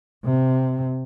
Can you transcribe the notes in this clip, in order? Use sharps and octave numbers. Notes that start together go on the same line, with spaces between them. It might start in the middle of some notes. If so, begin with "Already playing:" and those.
C3